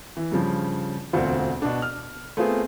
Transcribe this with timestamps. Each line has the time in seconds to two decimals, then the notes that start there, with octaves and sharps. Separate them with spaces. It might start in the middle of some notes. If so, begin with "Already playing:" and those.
0.17 E3
0.32 G2 C#3 F3
1.13 E1 D2 C4 F4
1.62 B2 D4
1.82 F6
2.37 A3 B3 C4 F4 G#4